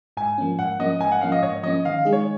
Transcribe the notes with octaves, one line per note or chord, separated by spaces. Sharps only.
G#2 G#5
F3 A#3 C#4
G#2 F#5
F3 A#3 C#4 D#5
G#2 G#5
F#5
F3 A#3 C#4 F5
D#5
G#2 C#5
F3 A#3 C#4 D#5
D#3 F5
G#3 D#4 G#4
C#5